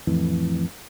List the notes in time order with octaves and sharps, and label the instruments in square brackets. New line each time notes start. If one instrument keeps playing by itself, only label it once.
[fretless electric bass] F2 A2 E3